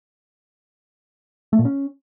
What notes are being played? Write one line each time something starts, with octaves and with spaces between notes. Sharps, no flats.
A3
A#2
C#4